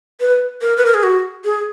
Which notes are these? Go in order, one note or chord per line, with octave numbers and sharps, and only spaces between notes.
B4
A#4
B4
A#4
G#4
F#4
G#4